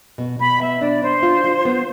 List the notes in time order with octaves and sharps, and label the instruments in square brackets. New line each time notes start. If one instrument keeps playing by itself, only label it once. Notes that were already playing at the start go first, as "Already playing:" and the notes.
[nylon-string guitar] B2
[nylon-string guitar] B2 [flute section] B5
[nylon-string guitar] B3 [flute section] E5
[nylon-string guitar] D4 [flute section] D5
[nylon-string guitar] D4 [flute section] C5
[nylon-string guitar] F4
F4
B3